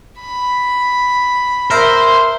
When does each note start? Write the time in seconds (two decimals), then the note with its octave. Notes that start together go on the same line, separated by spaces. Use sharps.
0.21 B5
1.71 A#4 C5 E5